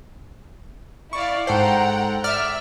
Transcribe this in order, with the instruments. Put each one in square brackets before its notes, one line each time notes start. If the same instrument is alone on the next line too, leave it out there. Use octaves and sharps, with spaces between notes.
[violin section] E4 D5 F5 [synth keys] C#6
[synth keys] G#2 A4 C5 [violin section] F#5 G5 A#5
[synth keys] D5 F6 [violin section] E5